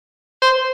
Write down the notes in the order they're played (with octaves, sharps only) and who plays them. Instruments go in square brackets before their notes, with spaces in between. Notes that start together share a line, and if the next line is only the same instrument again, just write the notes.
[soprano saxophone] C5